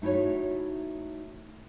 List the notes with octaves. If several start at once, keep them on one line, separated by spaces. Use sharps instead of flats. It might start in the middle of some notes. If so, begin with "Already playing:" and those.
A3 D#4 E4 F#4 C#5